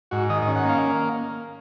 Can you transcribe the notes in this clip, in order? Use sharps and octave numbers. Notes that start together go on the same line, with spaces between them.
G#2 F#4
D#3 D#5
D#5
C#4
F#5
A#3 F5